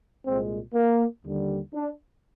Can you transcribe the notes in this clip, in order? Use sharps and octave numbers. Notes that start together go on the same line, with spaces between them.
C2 A#2 G#3 C4
A#3
D#2 D3 G3
D4